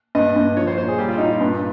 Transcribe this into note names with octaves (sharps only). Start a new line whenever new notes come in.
G2 D#5
G2
F3 C#5
C5
A#2 C5
G#4
G3 G4
F4
A#2 D#4
F4
G2